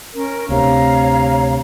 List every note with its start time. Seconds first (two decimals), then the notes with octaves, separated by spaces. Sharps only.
0.14 C#4 A#4
0.49 D2 C3 C#5 F5 A#5